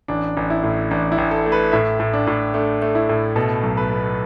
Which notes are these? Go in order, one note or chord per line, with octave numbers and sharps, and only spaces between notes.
A1 D4
A1
E4
A2
A1 D4
E4
A1
A4
A3
B4
A2 E5
A2
D4
A2
A3 D4
A3
E4
A2
B2 A4
B1
B4
B3